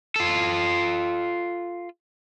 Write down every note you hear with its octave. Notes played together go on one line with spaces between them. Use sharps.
F4 A4